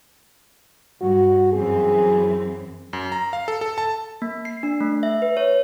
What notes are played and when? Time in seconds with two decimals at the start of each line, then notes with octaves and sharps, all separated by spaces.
1.02 G2 F#4
1.53 F#2 E3 C4 G#4
2.93 F#2
3.12 A#5
3.33 F5
3.48 A4
3.61 A4
3.78 A5
4.22 A#3
4.45 C7
4.63 D4
4.80 A3
5.03 E5
5.22 B4
5.37 C#5